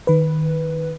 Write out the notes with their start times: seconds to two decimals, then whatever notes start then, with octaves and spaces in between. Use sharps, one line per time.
0.07 D#3 B4